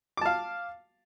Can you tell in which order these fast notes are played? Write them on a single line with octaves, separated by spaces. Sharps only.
D6 A5 F5